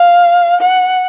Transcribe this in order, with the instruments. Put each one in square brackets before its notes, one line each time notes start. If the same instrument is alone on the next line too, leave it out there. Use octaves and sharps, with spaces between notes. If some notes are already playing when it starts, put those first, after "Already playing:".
Already playing: [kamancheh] F5
F#5